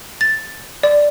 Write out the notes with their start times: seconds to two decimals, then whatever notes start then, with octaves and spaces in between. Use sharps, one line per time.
0.21 A6
0.83 D5